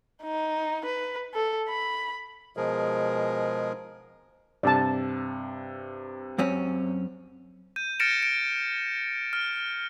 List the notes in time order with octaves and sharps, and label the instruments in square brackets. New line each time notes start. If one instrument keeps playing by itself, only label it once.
[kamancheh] D#4
B4
A4
B5
[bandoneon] B2 F3 G#3 G#4 A#4
[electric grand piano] G2 C3 [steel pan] D5 A5
[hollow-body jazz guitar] F#2 C4 C#4
[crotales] G6 D#7
F6 A6 A#6 C#7 D7 E7
D7
F6